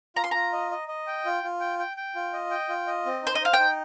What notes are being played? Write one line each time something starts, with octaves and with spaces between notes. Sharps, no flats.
F4 A#5
C6
F4 A#5
D#5
D#5
D#5
G5
F4
F4
G5
G5
G5
F4
D#5
G5
F4
D#5
C4
D#4 C5
D#5
C5 F5
G5
D#4